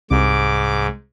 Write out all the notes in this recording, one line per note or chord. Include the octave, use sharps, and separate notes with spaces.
C2 G#2 D6